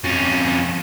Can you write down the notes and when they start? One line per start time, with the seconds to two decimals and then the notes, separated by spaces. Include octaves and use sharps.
0.04 F2 C#4